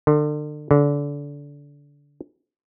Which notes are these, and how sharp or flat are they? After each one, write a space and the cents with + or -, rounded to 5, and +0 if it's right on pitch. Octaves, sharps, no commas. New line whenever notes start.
D3 +35
D3 -25